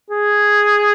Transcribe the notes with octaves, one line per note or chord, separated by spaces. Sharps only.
G#4